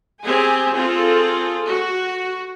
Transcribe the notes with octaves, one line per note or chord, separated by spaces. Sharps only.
C4 G4 G#4 G#5
C4 F4 G#4 A4
F#4